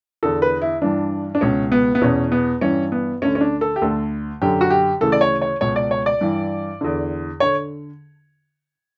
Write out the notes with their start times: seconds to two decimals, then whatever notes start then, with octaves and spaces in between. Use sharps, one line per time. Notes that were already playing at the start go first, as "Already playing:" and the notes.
0.23 E2 D3 A4
0.42 B4
0.62 E4
0.82 G2 E3 D4
1.35 D4
1.41 C#2 B2 C#4
1.72 B3
1.95 B3
2.02 E2 B2 C#4
2.32 B3
2.61 G2 E3 C#4
2.92 B3
3.21 D2 D3 C#4
3.35 C#4
3.41 D4
3.61 A4
3.76 G4
3.82 D2 D3 A4
4.42 F#2 D3 G4
4.61 F#4
4.70 G4
5.01 D2 C#3 E3 A4
5.12 D5
5.21 C#5
5.41 C#5
5.61 C#2 B2 C#5
5.76 D5
5.91 C#5
6.06 D5
6.21 G2 E3
6.81 E2 D3
7.40 D3 C#5